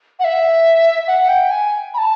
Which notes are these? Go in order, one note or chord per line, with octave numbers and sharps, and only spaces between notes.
F#5
E5
F#5
G5
G#5
B5
A5